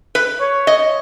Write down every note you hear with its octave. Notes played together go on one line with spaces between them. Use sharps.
B4
C#5
D#5